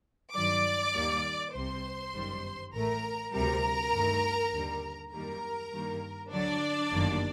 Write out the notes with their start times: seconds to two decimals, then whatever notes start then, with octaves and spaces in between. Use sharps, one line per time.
0.34 G2 D#3 F#3 D5 D6
0.95 D#2 D#3 G3 A#3
1.54 C2 C3 G3 C5 C6
2.14 G1 F#2 D#3 G3
2.73 A1 A2 A3 A#4 A#5
3.33 D2 C3 G3 A#4 A#5
3.93 G2 D#3 A3
4.53 D#2 D3 G3
5.12 F#2 D#3 G3 A#3 A#4 A#5
5.72 G2 D#3 G3 A#3
6.32 D2 D3 F#3 D4 D5
6.92 G1 F#2 D#3 G3 A#3